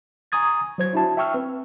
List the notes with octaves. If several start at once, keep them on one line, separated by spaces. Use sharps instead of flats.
G#5 A#5 C#6 D#6 G#6 A6
F#3 C5 G#6
D4 E4 F#4 E5 A5
E5 G5 C#6 E6 F6
C4 B4